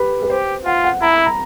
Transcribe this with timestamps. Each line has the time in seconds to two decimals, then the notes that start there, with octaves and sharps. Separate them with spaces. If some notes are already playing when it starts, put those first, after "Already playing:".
Already playing: G4 B4
0.23 B4
0.30 G4 C5
0.65 F4 F#5
0.84 F#5
1.02 E4 A#5
1.13 B5
1.26 A#5